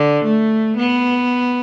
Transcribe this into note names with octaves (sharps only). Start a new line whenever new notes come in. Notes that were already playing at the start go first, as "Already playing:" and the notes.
Already playing: D3
A3
B3